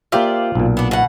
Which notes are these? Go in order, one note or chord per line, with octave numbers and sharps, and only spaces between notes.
A#3 F4 G4 C5 D5 E5
B1 A#2
B3 D4
B2 F#5